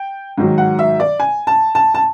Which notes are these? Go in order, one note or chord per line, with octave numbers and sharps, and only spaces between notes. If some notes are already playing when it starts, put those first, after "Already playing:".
Already playing: G5
G#2 D#3 F#3
F#5
E5
D5
G#5
A5
A5
A5